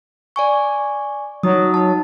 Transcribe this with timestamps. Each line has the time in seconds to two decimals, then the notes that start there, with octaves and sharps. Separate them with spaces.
0.36 D5 G#5 C#6
1.43 F#3 D#4 D#6
1.74 D#4 A5